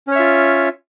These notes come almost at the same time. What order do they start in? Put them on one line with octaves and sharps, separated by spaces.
C#4 C#5 E5 F4